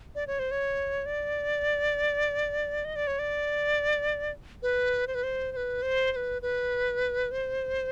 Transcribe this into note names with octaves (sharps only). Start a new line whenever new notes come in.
D5
C#5
C5
C#5
D5
D#5
D5
C#5
D5
B4
C5
B4
C5
C5
B4
C5
C5
B4
B4
C5